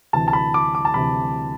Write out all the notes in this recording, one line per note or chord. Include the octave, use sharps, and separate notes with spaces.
D2 C3 E3 A5
A5
B5
D6
D6
A5
D2 C3 E3 B5